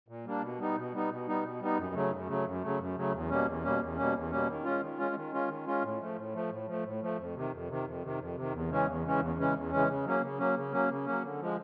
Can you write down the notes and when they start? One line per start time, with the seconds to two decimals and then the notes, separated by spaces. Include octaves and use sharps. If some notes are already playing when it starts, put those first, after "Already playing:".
0.08 A#2
0.25 G3 A#3 D4
0.43 B2
0.59 G3 B3 D#4
0.76 B2
0.93 G3 B3 D#4
1.10 B2
1.27 G3 B3 D#4
1.43 B2
1.61 G3 B3 D#4
1.78 F#2
1.94 C#3 F#3 A3
2.11 F#2
2.28 C#3 F#3 A3
2.46 F#2
2.62 C#3 F#3 A3
2.79 F#2
2.96 C#3 F#3 A3
3.13 E2
3.30 B2 G3 A#3 C#4
3.46 E2
3.63 B2 G3 A#3 C#4
3.81 E2
3.97 B2 G3 A#3 C#4
4.14 E2
4.31 B2 G3 A#3 C#4
4.48 D#3
4.64 G#3 C#4 F4
4.82 D#3
4.98 G#3 C#4 F4
5.15 D#3
5.32 G#3 C#4 F4
5.48 D#3
5.66 G#3 C#4 F4
5.82 A2
6.00 F3 A3
6.17 A2
6.34 F3 A3
6.50 A2
6.67 F3 A3
6.83 A2
7.01 F3 A3
7.18 F2
7.35 C3 D#3
7.51 F2
7.68 C3 D#3
7.86 F2
8.02 C3 D#3
8.19 F2
8.36 C3 D#3
8.53 E2
8.69 C#3 E3 G#3 C#4
8.87 E2
9.04 C#3 E3 G#3 C#4
9.21 E2
9.38 C#3 E3 G#3 C#4
9.54 E2
9.71 C#3 E3 G#3 C#4
9.88 C#3
10.05 F#3 A#3 C#4
10.22 C#3
10.38 F#3 A#3 C#4
10.56 C#3
10.72 F#3 A#3 C#4
10.89 C#3
11.06 F#3 A#3 C#4
11.23 D3
11.40 F3 G#3